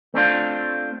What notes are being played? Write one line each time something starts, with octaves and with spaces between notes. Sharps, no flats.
A3 C4 D4 F4